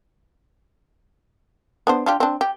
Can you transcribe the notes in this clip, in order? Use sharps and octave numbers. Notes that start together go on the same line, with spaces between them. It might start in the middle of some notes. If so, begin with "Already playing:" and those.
B3 D4 C5
D4 F4 G4
C4 D4
G4